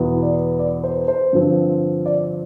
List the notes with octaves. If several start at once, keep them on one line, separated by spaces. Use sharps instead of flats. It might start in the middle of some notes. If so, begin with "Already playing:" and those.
Already playing: E2 B2 B3
D5
D5
C5
C5
G2 D3 F3 C4
D5